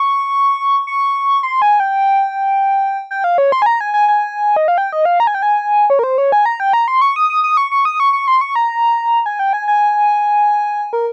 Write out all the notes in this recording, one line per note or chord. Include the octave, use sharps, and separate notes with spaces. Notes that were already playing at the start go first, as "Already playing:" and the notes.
Already playing: C#6
C#6
C6
G#5
G5
G5
F5
C#5
C6
G#5
A#5
G#5
G#5
G#5
D#5
F5
G5
D#5
F5
A#5
G#5
G5
G#5
C#5
A#4
C5
C#5
G#5
A#5
G5
A#5
C6
C#6
D#6
D#6
D#6
C#6
C#6
D#6
C#6
C#6
C6
C#6
A#5
G#5
G5
G#5
G#5
A#4